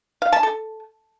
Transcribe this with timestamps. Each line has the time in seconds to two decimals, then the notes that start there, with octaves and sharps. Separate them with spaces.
0.22 F5
0.32 A5
0.43 A4